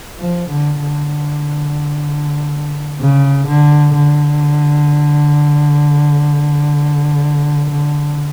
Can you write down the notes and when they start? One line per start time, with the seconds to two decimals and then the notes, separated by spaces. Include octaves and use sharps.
0.19 F3
0.50 D3
0.81 D3
3.00 C#3
3.47 D3
3.94 D3
7.70 D3